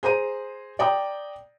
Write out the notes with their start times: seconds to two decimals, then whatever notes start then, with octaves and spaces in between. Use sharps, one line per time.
0.03 G#4 C5 A#5 D#7
0.79 D5 G5 A#5 D#6